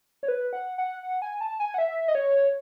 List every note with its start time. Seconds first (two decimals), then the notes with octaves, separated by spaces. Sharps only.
0.23 C#5
0.28 B4
0.53 F#5
0.78 F#5
1.03 F#5
1.22 G#5
1.41 A5
1.60 G#5
1.74 F#5
1.78 E5
2.08 D#5
2.15 C#5